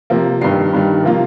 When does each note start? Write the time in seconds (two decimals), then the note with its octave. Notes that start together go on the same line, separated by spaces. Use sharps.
0.10 C3 F3 A#3
0.41 G2 D#3 G3 C7
0.73 G2 D#3 G3
1.04 C3 F3 A#3 F4